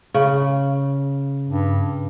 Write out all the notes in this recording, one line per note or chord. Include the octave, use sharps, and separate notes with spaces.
C#3
G2